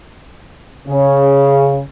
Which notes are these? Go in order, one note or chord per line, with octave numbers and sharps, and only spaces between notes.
C#3